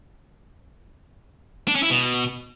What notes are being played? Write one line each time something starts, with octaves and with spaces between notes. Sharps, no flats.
D4
C#4
E4
B2